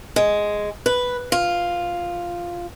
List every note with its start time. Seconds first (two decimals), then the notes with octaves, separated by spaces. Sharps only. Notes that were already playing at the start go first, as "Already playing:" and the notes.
0.16 G#3
0.86 B4
1.32 F4